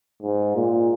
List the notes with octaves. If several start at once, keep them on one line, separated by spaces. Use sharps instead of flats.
G#2
A#2